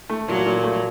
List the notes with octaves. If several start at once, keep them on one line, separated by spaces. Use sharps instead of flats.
A3
A#2 F#3
A#2
A3